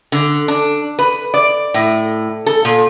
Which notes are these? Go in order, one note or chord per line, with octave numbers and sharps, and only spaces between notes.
D3
D4
B4
D5
A2
A4
A#2